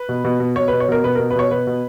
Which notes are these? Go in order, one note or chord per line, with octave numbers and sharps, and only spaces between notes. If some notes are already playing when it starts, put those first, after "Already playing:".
Already playing: B4
B2
B2
B2
B2 C#5
B2 B4
C#5
B2 A#4
B2 B4
B2 A#4
B4
B2 C#5
B2 B4
B2